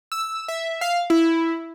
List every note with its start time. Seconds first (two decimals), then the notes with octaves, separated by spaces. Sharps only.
0.12 E6
0.48 E5
0.81 F5
1.10 E4